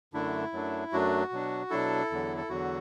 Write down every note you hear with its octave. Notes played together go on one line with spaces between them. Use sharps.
F#2 D3 A3 D4 E4
F#2 F#3 A3 D4
F#2 F#3 A3 D4 F#4
B2 F#3 D4
B2 F#3 D4 E4 A4
E2 D3 F#3
A4
E2 D3 F#3 F#4